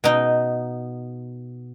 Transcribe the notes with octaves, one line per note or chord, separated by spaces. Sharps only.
B2 D#4